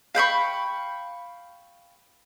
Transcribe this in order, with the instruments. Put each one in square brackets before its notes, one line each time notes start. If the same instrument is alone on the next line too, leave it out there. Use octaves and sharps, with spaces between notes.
[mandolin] F5 G5 B5 C#6